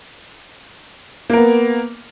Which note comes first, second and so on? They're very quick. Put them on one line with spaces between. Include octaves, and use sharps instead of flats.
A#3 A#4 B3